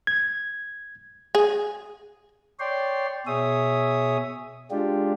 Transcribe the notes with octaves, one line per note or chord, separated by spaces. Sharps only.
G#6
G#4
C#5 D5 G5 C6
B2 G#4 C#5 E5 D#6
G#3 D4 F4 G4